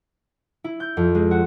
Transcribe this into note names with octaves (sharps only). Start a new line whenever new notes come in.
E4
G6
F2
G#3
F#4